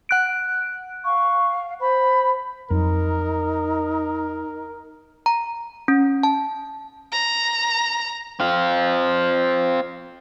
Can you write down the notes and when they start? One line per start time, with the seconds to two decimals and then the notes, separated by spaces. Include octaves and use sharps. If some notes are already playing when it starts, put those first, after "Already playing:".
0.09 F#5 F#6 D7
1.05 F5 C#6
1.81 C5 B5
2.70 F2 F#3 D#4 A#4
5.26 A#5
5.88 C#4
6.23 A5
7.11 A#5
8.40 C4 F4